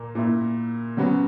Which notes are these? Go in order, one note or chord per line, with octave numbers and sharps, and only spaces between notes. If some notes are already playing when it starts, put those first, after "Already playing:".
Already playing: A#2 A#3
A#2 A#3 E4
C#3 F#3 B3 F#4